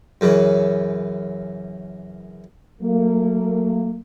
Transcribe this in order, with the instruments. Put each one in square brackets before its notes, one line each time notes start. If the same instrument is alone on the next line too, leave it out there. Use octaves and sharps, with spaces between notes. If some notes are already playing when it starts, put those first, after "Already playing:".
[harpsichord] F#2 C#3 E3
[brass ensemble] F#3 A3 A#3